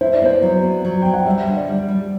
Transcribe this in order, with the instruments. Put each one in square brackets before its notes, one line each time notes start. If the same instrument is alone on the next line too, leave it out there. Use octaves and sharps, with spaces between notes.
[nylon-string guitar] E4 [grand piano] C5
[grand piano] D5
[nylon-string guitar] B3 [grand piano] C5
[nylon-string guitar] F#3
B3
F#3
[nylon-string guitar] F#3 [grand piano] G5
[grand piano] F#5
[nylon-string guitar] G3 [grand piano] E5
[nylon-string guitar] D3
[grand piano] D5
[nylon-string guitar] G3
G3